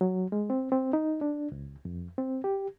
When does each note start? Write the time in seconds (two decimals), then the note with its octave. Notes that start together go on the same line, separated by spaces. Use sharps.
0.01 F#3
0.32 G#3
0.50 C4
0.72 C4
0.93 D#4
1.21 D4
1.52 C#2
1.85 F2
2.18 C4
2.44 G4